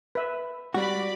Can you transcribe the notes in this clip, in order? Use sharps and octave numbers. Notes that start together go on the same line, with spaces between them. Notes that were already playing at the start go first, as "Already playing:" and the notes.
B4 E5
G3 F#4 D5 B5